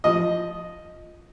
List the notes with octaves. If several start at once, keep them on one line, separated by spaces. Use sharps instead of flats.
F3 D#5